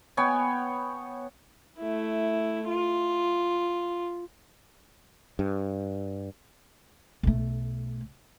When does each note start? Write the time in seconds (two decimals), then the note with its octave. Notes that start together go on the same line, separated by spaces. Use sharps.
0.17 B3 C#5 G5 G#5
1.78 A3 E4
2.67 F4
5.39 G2
7.23 B1 A3